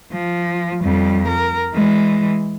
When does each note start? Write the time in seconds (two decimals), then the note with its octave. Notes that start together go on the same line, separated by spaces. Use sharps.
0.12 F3
0.82 F2 G3
1.27 A#4
1.74 E3 G#3